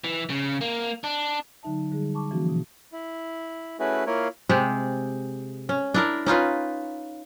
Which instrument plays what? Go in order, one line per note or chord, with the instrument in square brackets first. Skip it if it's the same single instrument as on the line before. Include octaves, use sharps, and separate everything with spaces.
[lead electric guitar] E3
C#3
A#3
D4
[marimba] D3 F#3 D#4 E5 A5
D3 G3 G#4
A5 C#6 D6
E3 F3 A#3 C#4 F#4
B2
[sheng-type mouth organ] E4
A3 C#4 E4 F#4 G#4 B4
A#3 E4 F4 A#4 C#5
[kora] C3 G#3 G4
C#4
D4 E4 A#4
C#4 D#4 F4 B4